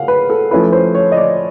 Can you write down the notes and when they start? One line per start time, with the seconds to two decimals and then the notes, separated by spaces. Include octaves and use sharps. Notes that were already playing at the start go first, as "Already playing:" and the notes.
Already playing: C#3 A#3 F5 F#5
0.08 B4
0.30 A4
0.51 F3 A3 C#4 E4 B4
0.72 C5
0.95 C#5
1.12 D#5
1.17 D5